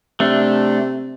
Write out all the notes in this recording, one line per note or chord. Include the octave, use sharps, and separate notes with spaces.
C3 A3 D4